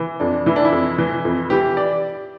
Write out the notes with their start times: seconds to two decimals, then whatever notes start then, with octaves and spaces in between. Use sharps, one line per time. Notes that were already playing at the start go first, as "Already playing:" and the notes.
Already playing: E3
0.20 F2 D4
0.46 E3 E4
0.56 D4
0.65 E4
0.72 F2
0.98 E3
1.25 F2
1.50 E3 G4
1.77 D5